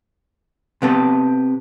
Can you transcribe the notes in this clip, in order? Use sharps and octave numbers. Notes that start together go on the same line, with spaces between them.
C3 B3 A4